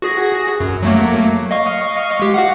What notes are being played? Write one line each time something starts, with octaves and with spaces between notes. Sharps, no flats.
F#4 G#4 A#6
F#2
F#3 A3 A#3
D#5 F5 C#6
G#3 G4
F#4 F5 F#5